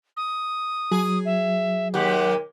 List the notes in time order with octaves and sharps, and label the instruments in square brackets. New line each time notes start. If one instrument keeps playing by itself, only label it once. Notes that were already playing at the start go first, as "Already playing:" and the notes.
[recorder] D#6
[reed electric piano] F#3 [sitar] G#4
[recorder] E5
[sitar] D#2 G#3 G4 [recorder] F#5